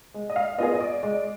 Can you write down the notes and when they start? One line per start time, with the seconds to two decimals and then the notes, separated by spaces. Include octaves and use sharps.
0.14 G#3
0.30 D#5
0.36 F5
0.58 B3 F4 G#4 D#5
0.73 D#5
0.80 D5
1.03 G#3 D5